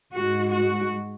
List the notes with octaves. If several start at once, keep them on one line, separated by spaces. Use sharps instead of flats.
G#2 G#3 F#4
F#4